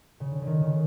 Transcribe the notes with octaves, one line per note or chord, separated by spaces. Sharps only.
C#3
D3
D3
D#3
C#3